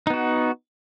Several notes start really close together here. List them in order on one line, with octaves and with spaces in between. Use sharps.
D#4 B3 F#4